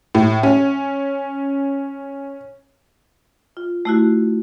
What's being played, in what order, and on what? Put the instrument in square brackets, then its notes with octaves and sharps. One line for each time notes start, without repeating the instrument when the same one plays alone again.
[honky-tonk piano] A2
C#4
[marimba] F4
A3 E4 F#4